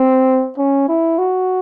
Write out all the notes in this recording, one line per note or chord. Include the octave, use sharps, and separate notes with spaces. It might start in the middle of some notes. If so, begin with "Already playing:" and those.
Already playing: C4
C#4
E4
F#4